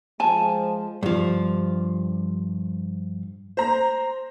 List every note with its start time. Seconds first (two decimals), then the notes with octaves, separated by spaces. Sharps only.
0.20 F3 G#3 G#5 A5
1.03 G2 F3
3.57 C5 A#5